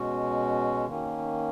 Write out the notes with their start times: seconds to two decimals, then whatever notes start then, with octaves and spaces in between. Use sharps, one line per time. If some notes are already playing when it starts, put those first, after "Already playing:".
Already playing: B2 G#3 C#4 F#4
0.86 D#3 A#3 C#4